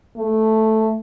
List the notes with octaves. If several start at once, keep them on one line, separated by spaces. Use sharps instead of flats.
A3